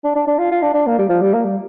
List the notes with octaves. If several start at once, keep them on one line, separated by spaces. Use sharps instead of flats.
D4
D4
D4
F4
F4
D4
D4
A#3
G3
F3
G3
A#3
G3